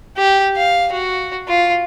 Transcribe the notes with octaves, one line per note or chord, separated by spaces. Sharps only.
G4
F5
F#4
F4